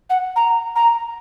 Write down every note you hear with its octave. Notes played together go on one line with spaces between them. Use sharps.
F#5
A#5
A#5